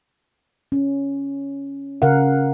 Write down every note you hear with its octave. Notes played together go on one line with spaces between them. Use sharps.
C#4
C#3 A#4 F5 F#5